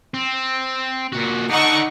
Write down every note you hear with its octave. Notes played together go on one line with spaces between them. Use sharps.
C4
A#2 F#4
D4 D#4 A4 F#5 C#6